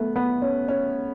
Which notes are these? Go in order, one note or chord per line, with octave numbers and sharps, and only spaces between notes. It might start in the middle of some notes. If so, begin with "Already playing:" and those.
Already playing: A3 B3
B3
C#4
C#4